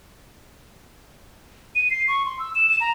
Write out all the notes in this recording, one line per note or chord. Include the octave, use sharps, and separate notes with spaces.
D#7
C7
C#6
C6
E6
E7
E7
A#5